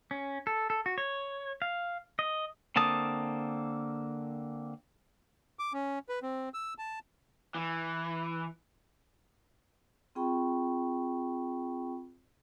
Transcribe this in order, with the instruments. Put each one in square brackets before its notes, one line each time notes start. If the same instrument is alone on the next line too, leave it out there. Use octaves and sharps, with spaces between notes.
[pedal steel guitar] C#4
A4
A4
F#4
C#5
F5
D#5
D3 A#3 C4 A5 D#6
[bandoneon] D6
C#4
B4
C4
E6
A5
[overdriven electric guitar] E3
[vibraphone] C4 F4 G#4 G5 B5 C#6